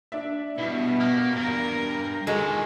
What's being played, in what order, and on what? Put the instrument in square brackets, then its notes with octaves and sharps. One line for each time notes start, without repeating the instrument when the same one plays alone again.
[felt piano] D4 D5 E5
[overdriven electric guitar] G2 [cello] B2 B3 [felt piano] E4 E5
[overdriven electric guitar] A#3 [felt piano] F6 G6
[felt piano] E2 [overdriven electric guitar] G2 [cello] A#4
[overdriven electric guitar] A#2 D#3 [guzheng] G#3 [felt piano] F#4 A4